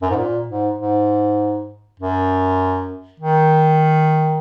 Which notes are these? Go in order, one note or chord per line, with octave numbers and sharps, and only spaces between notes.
F#2
G#2
A#2
G#2
G#2
F#2
D#3